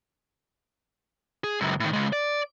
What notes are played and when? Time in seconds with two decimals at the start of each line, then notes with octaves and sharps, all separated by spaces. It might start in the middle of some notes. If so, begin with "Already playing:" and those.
1.44 G#4
1.61 C#2 F#2
1.80 A2 D#3
1.93 C#3 G#3
2.13 D5